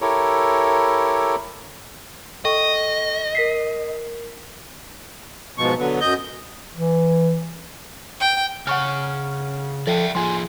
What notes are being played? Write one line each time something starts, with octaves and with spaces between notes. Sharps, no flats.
E4 G4 A4 A#4 C#5
A4 D#5 G5 C#6
A#4 B6 C7
G#2 B2 F3 C#6
D3 F#3 B3
F#2 D#5 G6
E3
G5
C#3 F#5 G#5 C#6 F6
F3 A4 D5 E5 G5
F3 F4 G#4 G#5 C6